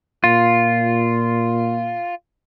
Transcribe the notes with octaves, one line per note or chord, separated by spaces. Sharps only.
A#2 F4